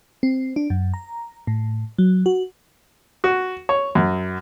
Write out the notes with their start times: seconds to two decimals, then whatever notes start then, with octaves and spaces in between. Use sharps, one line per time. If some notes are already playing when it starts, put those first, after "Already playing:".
0.23 C4
0.56 D4
0.70 F#2
0.94 A#5
1.47 A2
1.98 F#3
2.26 F#4
3.24 F#4
3.69 C#5
3.95 F#2